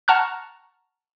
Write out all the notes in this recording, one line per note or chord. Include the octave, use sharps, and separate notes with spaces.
F#5 A5 A#5 C#6 F6 F#6